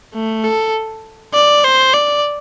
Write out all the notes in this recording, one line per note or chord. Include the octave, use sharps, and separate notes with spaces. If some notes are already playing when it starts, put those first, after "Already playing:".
A3
A4
D5
C5
D5